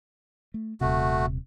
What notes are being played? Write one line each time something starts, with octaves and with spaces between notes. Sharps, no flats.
A3
D#1 C3 A3 F#4